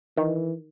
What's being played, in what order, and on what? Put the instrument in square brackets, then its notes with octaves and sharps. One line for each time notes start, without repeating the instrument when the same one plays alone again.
[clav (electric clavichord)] D#3 [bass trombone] E3